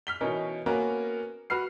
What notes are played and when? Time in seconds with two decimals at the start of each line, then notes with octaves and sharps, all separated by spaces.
0.07 F6 B6 G7
0.21 B2 E3 C#4 D#4 A#4
0.66 A#3 B3 C#4 F#4 A#4
1.50 F#4 B4 F6 C7